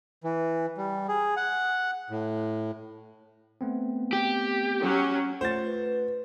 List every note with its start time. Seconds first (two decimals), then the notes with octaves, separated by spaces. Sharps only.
0.24 E3
0.78 G3
1.08 G#4
1.37 F#5
2.10 A2
3.61 A3 B3 C4
4.13 G4
4.83 F#3 C#4
5.41 A3 F4 C5 F#5 A6
5.67 B4